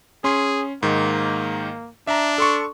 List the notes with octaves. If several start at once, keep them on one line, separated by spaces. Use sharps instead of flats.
C#4 G#4 C6
G#2 D#3 A#3
D4 E5 A#5
A4 C6 C#6